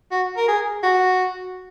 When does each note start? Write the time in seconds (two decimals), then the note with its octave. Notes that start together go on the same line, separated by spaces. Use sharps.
0.11 F#4
0.37 A#4
0.48 G#4
0.83 F#4